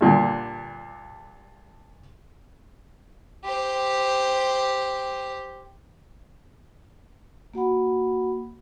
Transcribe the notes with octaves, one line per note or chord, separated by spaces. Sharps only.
G2 A#2 D3
G4 C5
A#3 F#4 F#5 B5